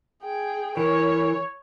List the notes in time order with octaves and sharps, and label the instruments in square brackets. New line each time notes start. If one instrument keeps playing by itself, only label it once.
[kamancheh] G#4 G5
[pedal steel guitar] E3 [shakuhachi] A#4 [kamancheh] C#5